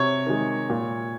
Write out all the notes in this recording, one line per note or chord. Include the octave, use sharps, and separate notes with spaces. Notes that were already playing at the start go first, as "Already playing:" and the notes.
Already playing: C3 C#5
D#3 G#3
A#2